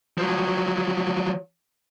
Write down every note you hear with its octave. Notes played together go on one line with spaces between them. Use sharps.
F3 F#3